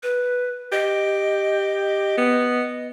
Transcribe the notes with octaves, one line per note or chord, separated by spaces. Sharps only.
B4
G4 D#5
B3